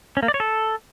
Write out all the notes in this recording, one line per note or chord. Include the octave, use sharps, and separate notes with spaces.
C#4
A#3
D5
C#5
A4